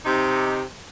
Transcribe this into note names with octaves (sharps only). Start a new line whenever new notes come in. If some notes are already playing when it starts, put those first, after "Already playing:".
C3 D#4